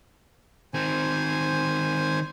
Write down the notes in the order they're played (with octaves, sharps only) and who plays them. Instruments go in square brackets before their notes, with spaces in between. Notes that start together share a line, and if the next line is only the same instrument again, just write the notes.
[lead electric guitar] D#3 C4 [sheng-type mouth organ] C5 G#5